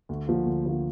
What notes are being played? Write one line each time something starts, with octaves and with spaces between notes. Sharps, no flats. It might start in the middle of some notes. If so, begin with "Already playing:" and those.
D2
D3 F3 A#3 F4
D2
D3 F3 A#3 F4